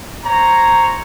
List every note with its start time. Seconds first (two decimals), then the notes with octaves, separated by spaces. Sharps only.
0.25 C5 C#5 A#5